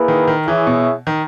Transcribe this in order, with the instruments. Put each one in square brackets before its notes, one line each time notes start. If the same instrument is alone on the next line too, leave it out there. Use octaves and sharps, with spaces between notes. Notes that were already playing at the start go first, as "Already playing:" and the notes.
Already playing: [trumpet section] A#3 E4 G#4 B4
[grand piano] D#3
D#3
[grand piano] E3 [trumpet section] E4 G#4 C#5 E5
[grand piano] B2
D#3